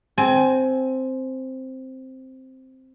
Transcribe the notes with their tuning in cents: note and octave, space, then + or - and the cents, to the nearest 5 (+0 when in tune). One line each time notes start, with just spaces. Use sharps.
C4 +0 G#5 +20